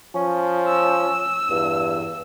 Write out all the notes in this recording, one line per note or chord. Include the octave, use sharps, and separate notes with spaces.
F3 C#4
E6
E2 G2